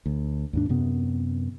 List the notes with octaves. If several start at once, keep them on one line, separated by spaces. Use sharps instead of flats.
D2
D#2 G#2 D4
F#2 C3 B3